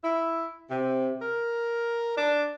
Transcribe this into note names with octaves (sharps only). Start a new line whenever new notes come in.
E4
C3
A#4
D4